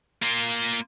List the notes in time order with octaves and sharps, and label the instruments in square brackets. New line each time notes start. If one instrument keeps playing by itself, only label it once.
[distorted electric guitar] A#3 F4